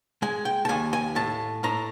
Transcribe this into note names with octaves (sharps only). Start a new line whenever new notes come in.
G#3 G#5
G5
A5
D#2 G#5
G#5
A2 A5
A2 A#5